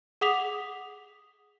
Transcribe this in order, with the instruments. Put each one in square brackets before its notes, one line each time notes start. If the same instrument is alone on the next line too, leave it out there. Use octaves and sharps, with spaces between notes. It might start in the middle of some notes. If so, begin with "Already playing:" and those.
[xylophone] G#4 F#5 D6 D#6 B6 F7